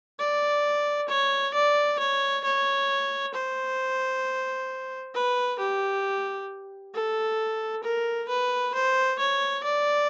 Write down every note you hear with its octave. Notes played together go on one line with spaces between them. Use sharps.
D5
C#5
D5
C#5
C#5
C5
B4
G4
A4
A#4
B4
C5
C#5
D5